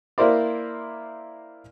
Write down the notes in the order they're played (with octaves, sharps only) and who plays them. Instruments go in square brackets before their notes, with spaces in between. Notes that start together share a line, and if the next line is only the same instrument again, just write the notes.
[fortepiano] A#3 E4 A#4 C5 D5